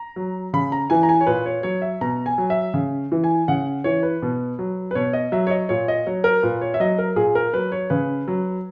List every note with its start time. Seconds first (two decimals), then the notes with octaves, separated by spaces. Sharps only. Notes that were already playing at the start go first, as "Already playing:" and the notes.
Already playing: A#5
0.16 F#3
0.53 C#3 B5
0.72 A#5
0.90 E3 G#5
1.03 A#5
1.09 G#5
1.21 C#5
1.27 A#2 B4
1.46 C#5
1.63 F#3 C#5
1.82 E5
2.01 B2 A#5
2.26 G#5
2.38 F#3
2.50 E5
2.74 C#3
3.12 E3
3.24 G#5
3.48 C#3 F#5
3.84 E3 C#5
4.03 B4
4.22 B2
4.59 F#3
4.91 B4
4.95 B2 C#5
5.13 D#5
5.32 F#3 E5
5.47 C#5
5.50 D#5
5.69 A#2 C#5
5.88 D#5
6.07 F#3 C#5
6.24 A#4
6.43 A#2 B4
6.61 C#5
6.74 E5
6.80 F#3 D#5
6.99 A#4
7.16 A#2 G#4
7.35 A#4
7.54 F#3 B4
7.72 C#5
7.90 C#3 B4
8.28 F#3